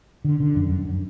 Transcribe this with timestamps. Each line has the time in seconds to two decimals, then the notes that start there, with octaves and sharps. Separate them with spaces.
0.24 D3
0.40 D3
0.56 F#2
0.72 F#2